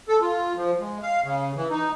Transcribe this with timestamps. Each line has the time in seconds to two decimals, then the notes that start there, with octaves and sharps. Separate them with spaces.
0.09 A4
0.21 F4
0.56 F3
0.80 G#3
1.02 F5
1.24 C#3
1.56 E3
1.71 D#4